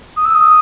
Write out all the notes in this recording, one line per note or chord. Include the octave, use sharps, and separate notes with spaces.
D#6
E6
D#6